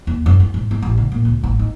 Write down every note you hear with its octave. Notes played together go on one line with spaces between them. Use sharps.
D#2
F#2
C#4
G#2
A3
A1
C#3
A#2
C#2
G#1
D#4